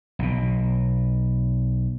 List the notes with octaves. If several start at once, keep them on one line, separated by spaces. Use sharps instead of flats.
B1 B2